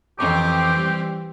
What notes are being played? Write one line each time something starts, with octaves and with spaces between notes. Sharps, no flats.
F2 E3 C4 G4 C#6 D6
G3